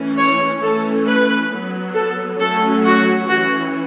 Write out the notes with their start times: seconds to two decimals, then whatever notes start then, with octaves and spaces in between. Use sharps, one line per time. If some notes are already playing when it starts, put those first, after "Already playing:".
Already playing: E3 A3 C#4
0.18 C#5
0.62 E3 A3 C#4 A4
1.06 B4
1.51 F#3 B3
1.95 A4
2.40 F#3 A3 C#4 A4
2.85 F#4
3.29 E3 C#4 F#4